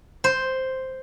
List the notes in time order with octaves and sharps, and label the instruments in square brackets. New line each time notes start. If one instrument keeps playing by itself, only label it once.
[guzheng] C5